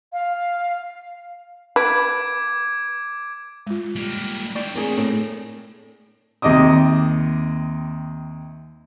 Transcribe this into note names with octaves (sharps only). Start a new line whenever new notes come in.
F5
B4 D6 G#6 D7
G#3 F4
G3 A#3
E4 D5 G5
A#3 C4 G#4 C#5
A2
D#2 C3 D#5 D6 D#6